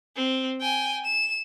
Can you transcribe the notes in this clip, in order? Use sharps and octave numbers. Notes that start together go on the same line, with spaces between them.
C4
G5 G#5
E7